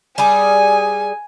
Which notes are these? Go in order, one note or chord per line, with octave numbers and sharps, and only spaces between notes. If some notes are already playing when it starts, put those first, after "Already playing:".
G3 G#4 G#5